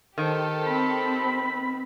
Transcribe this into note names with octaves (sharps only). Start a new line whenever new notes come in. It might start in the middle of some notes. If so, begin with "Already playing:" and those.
D#3 G4 A4 C5
C4 B5